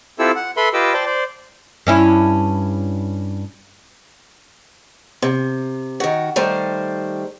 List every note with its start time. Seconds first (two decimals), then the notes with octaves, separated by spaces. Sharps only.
0.19 C4 E4 F4 G4 A4 E6
0.36 F#5
0.57 A4 B4 E5 B5 C6
0.73 F4 G4 B4 D#5 D6 E6
0.93 C5 D5 G5 A5
1.06 C5 D5
1.87 G2 C#4 E4
5.22 C3
6.00 D#3 F#4
6.36 D#3 G3 A3 C5